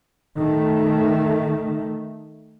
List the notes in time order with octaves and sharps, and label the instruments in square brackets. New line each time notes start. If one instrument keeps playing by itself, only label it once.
[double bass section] D#3 A3